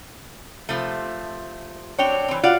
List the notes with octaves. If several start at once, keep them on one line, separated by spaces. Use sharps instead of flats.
C3 F3 A3
F#3 C4 D4 C#5 G5 F7
E3 C4
F4 F#4 D5 F5 F#5